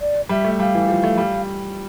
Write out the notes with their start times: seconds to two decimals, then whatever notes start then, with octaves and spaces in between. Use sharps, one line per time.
0.01 D5
0.29 G3 E5
0.44 A3
0.60 G3 F5
0.74 E3
0.88 F3
1.04 A3
1.18 G3